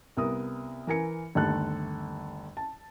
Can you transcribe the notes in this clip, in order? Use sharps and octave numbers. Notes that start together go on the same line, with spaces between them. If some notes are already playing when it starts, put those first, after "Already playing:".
C2 B3 A#4 D#6
E3 A#4 G#5 C#7
G1 D#2 A3 A4 F#6
A5